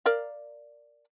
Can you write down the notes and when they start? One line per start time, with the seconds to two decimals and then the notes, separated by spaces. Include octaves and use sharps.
0.06 A#4 D5 F5